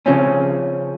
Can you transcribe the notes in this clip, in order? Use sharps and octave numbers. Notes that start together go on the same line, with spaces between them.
C#3 F3 C4 C#4